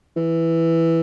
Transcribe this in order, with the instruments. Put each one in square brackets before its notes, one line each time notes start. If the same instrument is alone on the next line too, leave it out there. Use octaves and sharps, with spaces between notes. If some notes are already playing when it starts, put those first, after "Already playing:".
[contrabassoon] E3